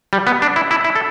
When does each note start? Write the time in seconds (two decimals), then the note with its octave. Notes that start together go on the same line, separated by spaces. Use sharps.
0.13 G3
0.27 B3
0.42 D4
0.56 E4
0.71 E4
0.84 E4
0.96 A4